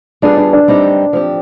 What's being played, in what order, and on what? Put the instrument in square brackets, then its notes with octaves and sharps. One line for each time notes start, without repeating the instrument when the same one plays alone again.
[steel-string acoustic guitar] G3 B3 F4 G#4 [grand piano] D4
[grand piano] D4
D4
[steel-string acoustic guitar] G3 C4 D#4 G4
F3 C4 G4